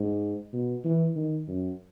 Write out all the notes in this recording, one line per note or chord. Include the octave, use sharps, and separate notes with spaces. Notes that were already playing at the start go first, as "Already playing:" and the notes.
Already playing: G#2
B2
E3
D#3
F#2